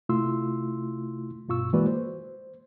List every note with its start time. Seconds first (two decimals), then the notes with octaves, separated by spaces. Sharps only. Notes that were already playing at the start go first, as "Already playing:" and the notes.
0.09 C3 A3 E4 F4 C6 E6
1.48 G2 B2 F4 C#6 E6
1.73 E3 G#3 A#3 F#4 B4 D5
1.86 C5